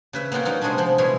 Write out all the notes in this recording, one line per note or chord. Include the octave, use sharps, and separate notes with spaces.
C#3 B4 E5
A#3 B3 C#4 F4 F#5 G5
F#3 G3 D#4 F4
C3 G3 G#3 B3 C#4 D4
C3 F3 B3 C5
B2 G3 G#3 E4 F4 C#5